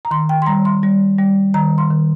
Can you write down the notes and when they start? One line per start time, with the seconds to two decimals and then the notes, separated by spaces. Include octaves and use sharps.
0.05 A#5
0.11 D#3 C6
0.29 G5
0.42 C6
0.46 G3 A#5
0.65 C6
0.83 G3
1.18 G3
1.54 D#3 A#5
1.78 C6
1.90 D#3